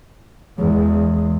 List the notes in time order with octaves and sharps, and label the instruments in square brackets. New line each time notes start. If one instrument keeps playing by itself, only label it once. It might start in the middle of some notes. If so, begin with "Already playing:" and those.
[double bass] E2 G#3